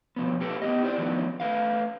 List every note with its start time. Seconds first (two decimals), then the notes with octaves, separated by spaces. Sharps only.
0.16 B2 F3 B3
0.40 A#3 G4 A4 B4
0.62 B3 G4 D#5
0.83 E4 C5 D5
0.98 D#3 F3 F#3 B3 B4
1.40 A3 B4 F5